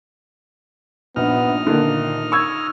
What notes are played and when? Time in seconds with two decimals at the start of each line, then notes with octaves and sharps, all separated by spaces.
1.16 A#1 G2 B3 D#4 F6
1.67 D3 D#3 A#3
2.32 C#6 E6 G#6